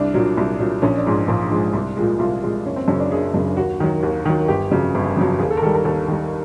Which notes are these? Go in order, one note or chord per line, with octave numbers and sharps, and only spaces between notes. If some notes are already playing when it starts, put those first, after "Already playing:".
Already playing: C2 D4
A#2 F#3
C2
A#2 F#3
A#1 C#4
D4
G#2 F3 G#3
A#1 F4
G#2 F3 G#3
C2
A#2 F3 G#3
C2 F4
A#2 F3 G#3
F#1 C#4
C4
F#2 C#3 C#4
D4
F#1 G#4
F#2 C#3
D#2 F#4
D#3 F#3
D#2
D#3 F#3
G1 G4
F2 C#3 F#3
G1
F2 C#3 F#3
D#2 G#4
A4
A#4
D#3 G3 A4
A#4
D#2 A4
D#3 G3